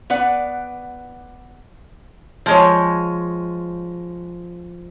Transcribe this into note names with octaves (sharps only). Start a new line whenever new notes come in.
B3 B4 D5 F#5
F3 G#3 C#5